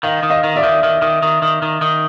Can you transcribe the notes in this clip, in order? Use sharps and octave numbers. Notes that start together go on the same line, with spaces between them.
D#3 D#5 F5
D#3
D#5 F5
D#3
D5 E5
D#3
D#3
D#3
D#3
D#3
D#3
D#3